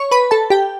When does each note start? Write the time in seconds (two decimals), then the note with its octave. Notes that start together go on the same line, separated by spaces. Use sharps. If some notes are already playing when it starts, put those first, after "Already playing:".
Already playing: C#5 C#6
0.11 B4 B5
0.31 A4 A5
0.50 G4 G5